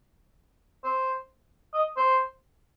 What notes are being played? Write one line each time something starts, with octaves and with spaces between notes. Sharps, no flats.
C5
D#5
C5